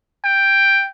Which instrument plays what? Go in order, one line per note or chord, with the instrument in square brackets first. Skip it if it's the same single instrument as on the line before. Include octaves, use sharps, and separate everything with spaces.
[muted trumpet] G5